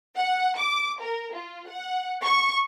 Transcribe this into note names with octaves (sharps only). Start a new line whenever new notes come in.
F#5
D6
A#4
F4
F#5
C#6